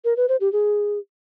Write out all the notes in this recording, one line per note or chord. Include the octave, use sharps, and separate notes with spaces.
A#4
B4
C5
G4
G#4